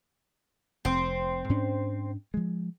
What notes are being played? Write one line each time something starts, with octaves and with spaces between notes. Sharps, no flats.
F1 C4
G#2 C#4 D4
F3 G#3